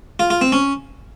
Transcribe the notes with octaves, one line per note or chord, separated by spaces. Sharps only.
F4
F4
C4
C#4